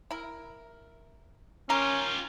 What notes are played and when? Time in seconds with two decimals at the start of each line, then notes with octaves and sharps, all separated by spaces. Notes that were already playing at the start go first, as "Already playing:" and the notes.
0.11 E4 A#4
1.70 C#4 F4 G4 A#4